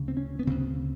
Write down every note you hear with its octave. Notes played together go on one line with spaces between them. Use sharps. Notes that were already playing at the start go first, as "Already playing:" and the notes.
Already playing: D2 C#3
C4
C#4
B3
D2 C#3 C4